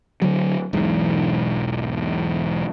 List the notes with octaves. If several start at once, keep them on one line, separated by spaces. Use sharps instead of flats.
D3 F#3
E1 B1 G#2 E3